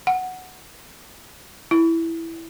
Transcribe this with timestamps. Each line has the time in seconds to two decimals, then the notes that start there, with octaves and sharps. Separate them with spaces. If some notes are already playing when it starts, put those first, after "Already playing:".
0.07 F#5
1.71 E4